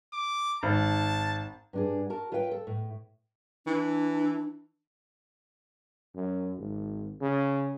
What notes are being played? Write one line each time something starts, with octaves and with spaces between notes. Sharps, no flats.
D6
G#1 A5
G2 D4 G#4
F#4 A#4 A5
F4 B4 C#5 F5 G5
A4
A2
E3 D4
F#2
G#1
C#3